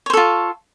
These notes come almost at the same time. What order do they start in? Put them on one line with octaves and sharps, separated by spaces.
C#5 C5 A4 F4